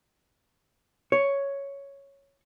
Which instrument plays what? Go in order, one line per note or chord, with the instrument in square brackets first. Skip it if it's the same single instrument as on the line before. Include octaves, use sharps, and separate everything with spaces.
[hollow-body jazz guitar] C#5